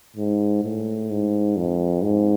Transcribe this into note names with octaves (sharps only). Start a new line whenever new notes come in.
G#2
A2
G#2
F2
G#2